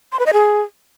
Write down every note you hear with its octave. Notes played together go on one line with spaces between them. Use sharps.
C6
B4
D#5
G#4